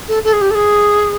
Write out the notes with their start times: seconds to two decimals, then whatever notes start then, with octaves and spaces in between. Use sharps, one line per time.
0.08 A4
0.24 A4
0.33 G#4
0.41 G4
0.51 A4
0.55 G#4